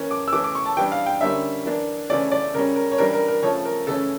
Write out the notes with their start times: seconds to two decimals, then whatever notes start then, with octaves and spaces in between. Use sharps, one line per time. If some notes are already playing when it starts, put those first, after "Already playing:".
Already playing: E3 A#3 C#4
0.11 D6
0.28 E6
0.33 E3 A3 C#4 D6
0.44 D6
0.55 C#6
0.65 A5
0.77 E3 G3 D4 G5
0.92 F5
1.06 G5
1.21 D3 G3 A#3 C#4 E5
1.66 E3 A#3 D4
2.10 C#3 E3 A3 C#4 D5
2.32 D5
2.54 C#3 G3 C#4 A#4
2.76 A#4
2.92 C#5
2.98 E3 G3 D4 A#4
3.13 A#4
3.28 A#4
3.42 C#3 F3 A3 C#5
3.65 A#4
3.87 C#3 E3 A3 C#4 A4